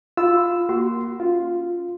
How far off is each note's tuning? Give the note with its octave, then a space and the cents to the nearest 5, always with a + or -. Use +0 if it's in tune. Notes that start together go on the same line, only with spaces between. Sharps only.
F4 +0 B5 +25 E6 +0
A#3 +0 F#4 +25 C6 -10
C#4 +0 F4 +0